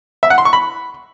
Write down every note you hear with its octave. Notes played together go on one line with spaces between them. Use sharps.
E5
F#5
C6
C#6
B5